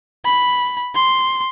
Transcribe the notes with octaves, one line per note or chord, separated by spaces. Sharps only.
B5
C6